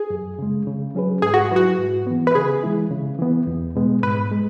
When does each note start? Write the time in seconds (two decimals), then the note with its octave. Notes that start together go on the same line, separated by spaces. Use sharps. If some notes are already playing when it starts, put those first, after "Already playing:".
Already playing: G#4
0.10 F#2
0.39 C#3 G#3
0.67 C#3
0.95 F#3 C#4 G#4 B4
1.22 G#2 G#4
1.34 F#4
1.51 F#3 E4 F#4 B4
1.79 G#2
2.07 E3 B3
2.27 B4
2.35 C#3 G#4
2.63 E3 G#3 E4
2.91 C#3
3.19 E3 B3
3.47 E2
3.76 B2 G#3 B3
4.03 G#2 B4
4.32 G#3